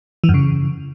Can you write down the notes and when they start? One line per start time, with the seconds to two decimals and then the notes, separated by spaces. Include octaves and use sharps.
0.24 E3
0.29 F#2
0.34 C#3